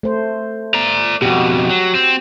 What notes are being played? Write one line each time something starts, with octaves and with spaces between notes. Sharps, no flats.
A3 C5
D5 A#5
F2 B2 F#4 G4
F#3
C4